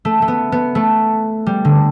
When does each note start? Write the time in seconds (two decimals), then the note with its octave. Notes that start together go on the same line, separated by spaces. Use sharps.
0.05 A3
0.22 A3
0.28 B3
0.52 B3
0.75 A3
1.47 G3
1.65 D3